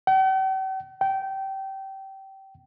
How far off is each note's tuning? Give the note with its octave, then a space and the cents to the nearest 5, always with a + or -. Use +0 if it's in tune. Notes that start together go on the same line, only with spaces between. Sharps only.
G5 -45
G5 -20